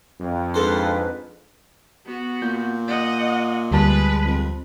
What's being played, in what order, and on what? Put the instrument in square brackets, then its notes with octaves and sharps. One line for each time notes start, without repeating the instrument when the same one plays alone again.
[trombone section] F2
[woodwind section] G#2 D4 B4 [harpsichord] G#3 A4 C5
[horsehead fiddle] B3 F#4
[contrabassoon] A#2 [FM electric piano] G6
[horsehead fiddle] D#5 F#5
[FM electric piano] D2 G3 A5 [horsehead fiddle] G#3 B4
[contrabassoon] F2